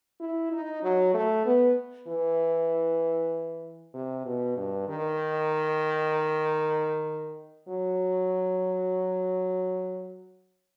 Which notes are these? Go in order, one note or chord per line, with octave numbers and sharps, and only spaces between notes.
E4
D#4
F#3
A3
B3
E3
C3
B2
G2
D#3
F#3